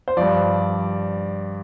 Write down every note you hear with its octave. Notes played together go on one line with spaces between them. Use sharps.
C5
G2 F3 D5